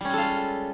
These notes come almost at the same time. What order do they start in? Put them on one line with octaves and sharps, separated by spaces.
G3 C#4 G#3 A4 F4